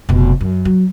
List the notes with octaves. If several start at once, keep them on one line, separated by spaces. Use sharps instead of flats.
F1 B2
F#2
F#3